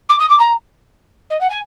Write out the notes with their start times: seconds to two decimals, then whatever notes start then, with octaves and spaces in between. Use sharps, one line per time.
0.09 D6
0.19 D#6
0.29 D6
0.39 A#5
1.30 D#5
1.41 F#5
1.50 G#5